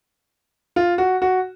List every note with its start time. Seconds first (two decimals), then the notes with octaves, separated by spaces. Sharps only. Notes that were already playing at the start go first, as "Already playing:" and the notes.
0.76 F4
0.98 F#4
1.22 F#4